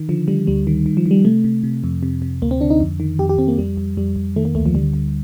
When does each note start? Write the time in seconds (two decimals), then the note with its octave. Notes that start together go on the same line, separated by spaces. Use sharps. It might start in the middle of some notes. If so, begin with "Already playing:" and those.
Already playing: D#3
0.09 D3 F3
0.28 D3 G3
0.47 D2 G3
0.67 D#3
0.86 D#3
0.97 F3
1.06 D#3
1.11 G3
1.25 C3 A3
1.44 C3
1.63 C3
1.84 F2
2.03 C3
2.22 C3
2.42 D2 A#3
2.51 C4
2.61 D3 D4
2.70 D#4
2.80 F2
3.00 D#3
3.19 F2 G4
3.29 G4
3.38 F2 C4
3.48 A#3
3.58 F2 G3
3.77 F2
3.97 F2 G3
4.16 F2
4.36 D#3 A3
4.45 A#3
4.55 D2 A3
4.66 F3
4.75 D3 G3
4.93 D3